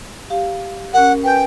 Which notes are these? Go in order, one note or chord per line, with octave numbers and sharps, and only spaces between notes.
G4 F5
C#4 A#4 F#5
B4 G5 G#5 G6